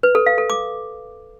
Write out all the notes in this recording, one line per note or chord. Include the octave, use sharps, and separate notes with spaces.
B4
A4
F5
A4
D6